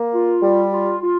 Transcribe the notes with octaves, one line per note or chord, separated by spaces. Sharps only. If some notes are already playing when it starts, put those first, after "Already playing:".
Already playing: A#3
F4
G3
F4
F4